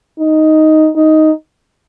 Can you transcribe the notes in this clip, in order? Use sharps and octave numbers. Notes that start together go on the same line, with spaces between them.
D#4
D#4